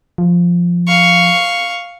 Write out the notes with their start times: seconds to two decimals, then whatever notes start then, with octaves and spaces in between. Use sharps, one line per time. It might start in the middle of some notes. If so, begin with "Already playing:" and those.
0.18 F3
0.88 F5 C#6